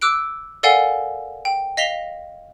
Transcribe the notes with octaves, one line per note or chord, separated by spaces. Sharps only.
D6 E6 F#6 D7
A4 A#4 D5 F5 F#5 G#5
G5
D#5 F5 A#6 B6 F7 G7